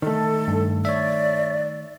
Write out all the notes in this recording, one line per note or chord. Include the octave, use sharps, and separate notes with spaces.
D#3 A3 A4
G2
C#5 D5 E5